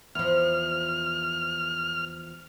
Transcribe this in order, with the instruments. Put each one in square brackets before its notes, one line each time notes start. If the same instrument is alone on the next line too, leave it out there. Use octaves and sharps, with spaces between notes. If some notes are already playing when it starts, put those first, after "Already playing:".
[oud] E2 F3 [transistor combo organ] F6